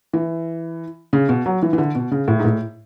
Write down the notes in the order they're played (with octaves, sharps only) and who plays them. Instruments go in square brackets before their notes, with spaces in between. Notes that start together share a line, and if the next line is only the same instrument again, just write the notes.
[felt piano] E3
C#3
B2
F#3
E3
E3
D3
B2
C#3
A2
G#2
A2